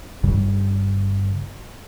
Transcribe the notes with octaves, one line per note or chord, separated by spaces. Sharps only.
G1 G2 C#3 G3